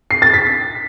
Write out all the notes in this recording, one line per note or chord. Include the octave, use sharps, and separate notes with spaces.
C7
A6
B6